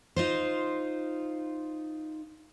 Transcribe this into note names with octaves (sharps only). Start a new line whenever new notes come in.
D#4 F4 C5